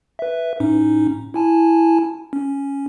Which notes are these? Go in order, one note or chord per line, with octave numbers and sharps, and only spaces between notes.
B4 E5
A2 C#4 D#4
E4 G#5 A5
C#4